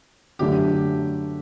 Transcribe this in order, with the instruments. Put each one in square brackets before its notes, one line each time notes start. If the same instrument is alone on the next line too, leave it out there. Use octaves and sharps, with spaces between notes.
[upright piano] F#2 D3 A3 D4 [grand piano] G4